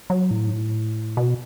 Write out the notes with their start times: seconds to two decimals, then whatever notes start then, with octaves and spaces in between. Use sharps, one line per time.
0.10 F#3
0.31 A2
0.48 G#2
0.52 A2
1.17 B2